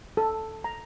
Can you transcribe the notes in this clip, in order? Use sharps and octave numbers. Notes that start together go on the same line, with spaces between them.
A4
A#5